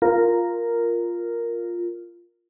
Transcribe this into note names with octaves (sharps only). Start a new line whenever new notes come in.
F4 A#4